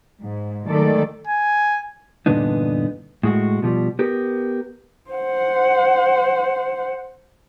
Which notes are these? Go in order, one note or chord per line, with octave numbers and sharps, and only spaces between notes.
G#2
D#3 F#3 G#3 A3 A4 D5
G#5
E2 G2 A#2 D3 B3 D#4
A2 G#3 F#4
B2 F3 G3
B3 G4 A#4
C5 F#5